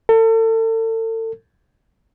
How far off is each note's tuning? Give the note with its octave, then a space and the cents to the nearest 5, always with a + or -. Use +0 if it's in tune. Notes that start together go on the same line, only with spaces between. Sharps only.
A4 +35